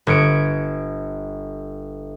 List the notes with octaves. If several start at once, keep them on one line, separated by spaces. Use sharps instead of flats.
G1 G#6 C#7 D7